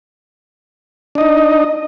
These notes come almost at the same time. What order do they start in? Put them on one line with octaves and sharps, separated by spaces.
D4 D#5 D#4